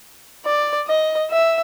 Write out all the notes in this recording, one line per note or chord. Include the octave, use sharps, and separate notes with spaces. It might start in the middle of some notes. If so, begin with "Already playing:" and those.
D5
D#5
E5